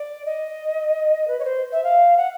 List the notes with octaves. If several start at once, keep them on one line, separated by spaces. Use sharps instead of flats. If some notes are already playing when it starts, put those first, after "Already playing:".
Already playing: D5
D#5
B4
C#5
C5
E5
F5
F#5